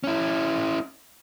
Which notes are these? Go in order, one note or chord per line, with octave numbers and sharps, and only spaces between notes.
C#4 E4